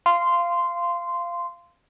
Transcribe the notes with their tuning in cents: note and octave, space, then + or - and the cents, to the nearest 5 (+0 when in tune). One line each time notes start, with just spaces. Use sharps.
F5 -15 C6 -10